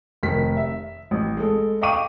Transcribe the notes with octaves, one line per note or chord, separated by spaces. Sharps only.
F1 D#3 B6
E5
A1
G#3 A4
D#5 F5 G5 C#6 D6 D#7